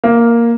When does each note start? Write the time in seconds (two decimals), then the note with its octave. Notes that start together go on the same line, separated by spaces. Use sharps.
0.04 A#3